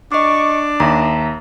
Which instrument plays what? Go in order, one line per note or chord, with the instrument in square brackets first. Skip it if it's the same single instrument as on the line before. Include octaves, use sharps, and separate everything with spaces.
[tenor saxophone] D4 [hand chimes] D#5 D6 [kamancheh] C#6
[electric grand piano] D#2 [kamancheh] E5 [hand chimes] A#5